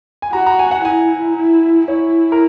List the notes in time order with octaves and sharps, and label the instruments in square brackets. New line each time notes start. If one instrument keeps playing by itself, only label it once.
[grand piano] G#5
[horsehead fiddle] F#4 [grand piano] A#5
[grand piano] A#5
G#5
F#5
[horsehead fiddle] E4 [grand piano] G#5
[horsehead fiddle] E4
[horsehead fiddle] E4 [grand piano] C#5
[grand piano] A#4